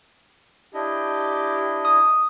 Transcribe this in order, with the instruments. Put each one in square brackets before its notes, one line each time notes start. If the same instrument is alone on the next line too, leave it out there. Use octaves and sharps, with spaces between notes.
[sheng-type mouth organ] D4 E4 D#5 [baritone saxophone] G4
[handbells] D#6